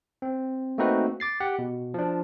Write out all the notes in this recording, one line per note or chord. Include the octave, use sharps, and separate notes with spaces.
C4
A3 A#3 C4 D#4 F#4 B4
D6 A6 C7
G4 F#5
B2
F3 D4